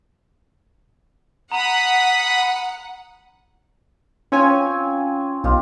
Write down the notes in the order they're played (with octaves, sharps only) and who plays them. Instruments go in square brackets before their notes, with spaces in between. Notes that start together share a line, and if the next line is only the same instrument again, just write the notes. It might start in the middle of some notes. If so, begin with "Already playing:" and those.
[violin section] F#5 [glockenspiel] A#5 F7 [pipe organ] B5 D#6
[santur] C4 F4 [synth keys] C#4 C#5 G#5
[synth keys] B1 [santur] F4 G4 D#5